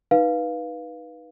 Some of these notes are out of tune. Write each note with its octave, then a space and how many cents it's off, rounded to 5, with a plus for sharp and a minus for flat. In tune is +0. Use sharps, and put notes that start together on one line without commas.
D#4 +0 B4 -10 F5 +0